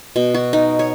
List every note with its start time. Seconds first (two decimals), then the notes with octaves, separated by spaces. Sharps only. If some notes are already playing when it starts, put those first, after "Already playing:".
0.16 B2
0.35 F#4
0.53 D#4
0.79 C#5